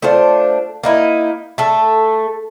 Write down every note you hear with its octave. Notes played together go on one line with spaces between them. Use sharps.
A3 D4 F4 C5
A#3 D#4 E4
A3 A4